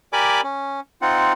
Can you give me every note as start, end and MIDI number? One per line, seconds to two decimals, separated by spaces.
0.13 0.41 67
0.13 0.41 70
0.13 0.41 74
0.13 0.41 80
0.13 0.41 83
0.13 0.41 86
0.43 0.80 61
1.02 1.33 60
1.02 1.33 63
1.02 1.33 65
1.02 1.33 78